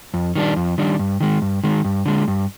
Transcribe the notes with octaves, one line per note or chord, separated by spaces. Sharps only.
F2
D#3 G3 D4
F2
D#3 G3 D4
G2
D#3 G#3
G2
D#3 G#3
G2
D3 G#3
G2